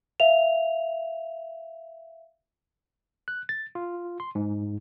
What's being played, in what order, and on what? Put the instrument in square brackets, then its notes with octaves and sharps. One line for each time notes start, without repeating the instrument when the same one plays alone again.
[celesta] E5 F5 F7
[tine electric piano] F#6
A6
F4
C6
G#2